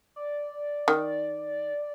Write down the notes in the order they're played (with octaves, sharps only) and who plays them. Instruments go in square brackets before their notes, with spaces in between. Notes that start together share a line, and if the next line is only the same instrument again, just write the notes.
[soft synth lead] D5
[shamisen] D#3